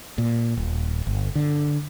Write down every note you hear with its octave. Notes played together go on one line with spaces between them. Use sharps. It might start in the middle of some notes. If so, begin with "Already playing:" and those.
A#2
D#1
G1
D3